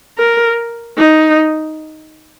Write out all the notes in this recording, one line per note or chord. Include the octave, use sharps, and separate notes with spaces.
A#4
D#4